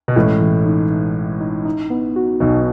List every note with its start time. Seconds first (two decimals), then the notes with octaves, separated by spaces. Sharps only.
0.08 B2
0.16 A1 A2 G#3
0.41 E3
0.65 D#4
0.90 D#4
1.16 E3
1.40 D#4
1.65 D#4
1.90 B3
2.16 F#4
2.40 B1 B2 B3